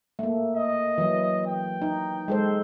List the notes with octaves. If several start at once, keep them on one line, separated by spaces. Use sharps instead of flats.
A3 A#3
D#5
E3 F#3
G5
D#4
G#3 A4 C5